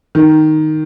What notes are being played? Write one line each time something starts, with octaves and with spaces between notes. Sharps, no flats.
D#3